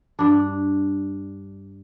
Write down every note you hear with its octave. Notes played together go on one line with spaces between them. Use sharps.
G2 D4